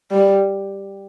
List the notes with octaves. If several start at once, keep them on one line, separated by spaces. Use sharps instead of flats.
G3